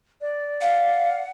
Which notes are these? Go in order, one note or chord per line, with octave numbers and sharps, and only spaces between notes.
D5
F5 F#5